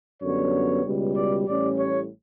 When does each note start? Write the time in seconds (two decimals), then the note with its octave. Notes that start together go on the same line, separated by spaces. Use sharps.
0.22 F#2 D3 G3 B3 C#5
0.84 C#2 B2 G3
1.16 D5
1.46 A1 A2 G3 C#4 D5
1.78 C#5